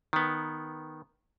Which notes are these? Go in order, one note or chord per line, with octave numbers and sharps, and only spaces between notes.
D#3 B3